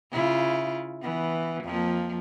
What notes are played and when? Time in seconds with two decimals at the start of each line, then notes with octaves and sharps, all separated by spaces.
0.11 C#3 E4 F4
1.02 E3 B3
1.63 F2 F3 A#3